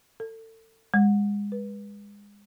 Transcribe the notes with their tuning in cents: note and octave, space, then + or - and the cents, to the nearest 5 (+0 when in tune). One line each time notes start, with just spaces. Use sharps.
A4 +30
G#3 -30
B4 -20